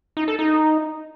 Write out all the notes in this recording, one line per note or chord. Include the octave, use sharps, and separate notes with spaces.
D#4
A4
D#4